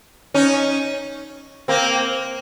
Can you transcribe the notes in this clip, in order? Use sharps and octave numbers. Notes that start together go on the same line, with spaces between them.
C#4 D#4
A#3 C4